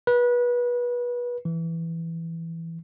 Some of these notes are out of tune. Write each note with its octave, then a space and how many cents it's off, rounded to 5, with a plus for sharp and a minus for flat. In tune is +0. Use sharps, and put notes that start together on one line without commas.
B4 -25
E3 +5